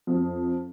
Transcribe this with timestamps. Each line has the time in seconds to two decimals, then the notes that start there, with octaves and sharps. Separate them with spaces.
0.07 F2